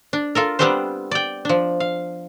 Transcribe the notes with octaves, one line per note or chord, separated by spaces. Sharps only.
D4
F4 A4 A#4
G3 B3 C4 D4 G4 C5
D5 G5
F3 D4
F5